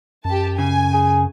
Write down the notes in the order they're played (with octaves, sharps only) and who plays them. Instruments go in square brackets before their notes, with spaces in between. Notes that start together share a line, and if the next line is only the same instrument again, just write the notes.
[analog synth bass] F#2 [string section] G4 A5
[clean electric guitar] C#3 [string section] G#5
[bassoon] G#4